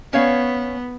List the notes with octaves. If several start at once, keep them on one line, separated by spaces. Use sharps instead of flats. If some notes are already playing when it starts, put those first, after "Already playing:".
B3 C#4 C#5 F5